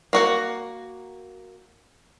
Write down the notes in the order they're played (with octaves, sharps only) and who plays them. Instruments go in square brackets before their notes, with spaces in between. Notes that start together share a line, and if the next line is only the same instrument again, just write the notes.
[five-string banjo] A#3 F#4 F#5